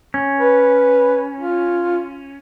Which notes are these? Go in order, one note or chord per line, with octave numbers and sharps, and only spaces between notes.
C#4
B4
F4